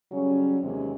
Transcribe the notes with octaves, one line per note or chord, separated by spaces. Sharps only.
C#3 F#3 G3 C#4
D#2 C3 E3 G#3 C4 C#4